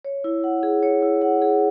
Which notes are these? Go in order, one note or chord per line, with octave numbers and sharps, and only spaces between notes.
C#5
E4
F#5
G#4
C#5
E4
F#5
G#4